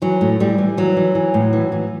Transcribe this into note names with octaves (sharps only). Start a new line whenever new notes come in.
E3 F#3
A2
A2 G3
E3
E3 F#3
E3
E3
A2
E3
E3